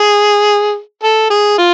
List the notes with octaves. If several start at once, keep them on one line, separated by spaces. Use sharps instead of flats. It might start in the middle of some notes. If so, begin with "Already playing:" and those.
Already playing: G#4
A4
G#4
F4